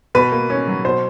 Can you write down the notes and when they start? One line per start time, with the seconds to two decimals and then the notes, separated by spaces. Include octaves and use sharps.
0.15 B2 B4
0.32 A#3
0.50 C#4
0.67 F#3
0.84 B2 C5